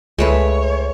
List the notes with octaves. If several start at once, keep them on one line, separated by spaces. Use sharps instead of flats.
C#2 G#3 A3 B4 C#5